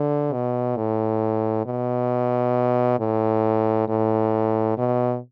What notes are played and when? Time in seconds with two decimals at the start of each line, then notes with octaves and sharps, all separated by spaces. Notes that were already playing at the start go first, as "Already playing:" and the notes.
Already playing: D3
0.33 B2
0.77 A2
1.66 B2
2.99 A2
3.89 A2
4.78 B2